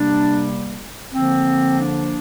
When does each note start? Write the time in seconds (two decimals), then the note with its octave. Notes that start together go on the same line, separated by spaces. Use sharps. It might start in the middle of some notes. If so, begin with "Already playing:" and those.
Already playing: C3 G3 A#3 D4
1.12 D3 F3 A#3 C4
1.80 D4